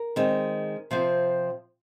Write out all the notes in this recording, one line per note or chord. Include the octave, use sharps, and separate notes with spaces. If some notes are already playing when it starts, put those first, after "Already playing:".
Already playing: A#4
D#3 G#3 C4
C3 F3 C4